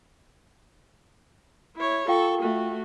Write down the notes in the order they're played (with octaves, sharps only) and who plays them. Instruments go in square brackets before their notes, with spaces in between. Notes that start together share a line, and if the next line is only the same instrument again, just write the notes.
[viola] E4 C#5
[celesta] F4 F5 G5 [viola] A4 C#6
[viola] A3 F#4